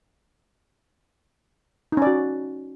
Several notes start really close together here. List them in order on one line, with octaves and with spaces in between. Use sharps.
D#4 C#4 D5 F#4